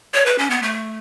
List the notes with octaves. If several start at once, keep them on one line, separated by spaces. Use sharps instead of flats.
C#5
B4
C#4
B3
A3